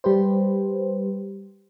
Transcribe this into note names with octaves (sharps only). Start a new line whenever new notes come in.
G3 G4 B4 C5